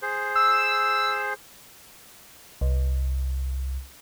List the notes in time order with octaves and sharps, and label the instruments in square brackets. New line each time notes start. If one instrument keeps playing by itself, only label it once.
[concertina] G#4 C5
[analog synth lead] E6
[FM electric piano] C2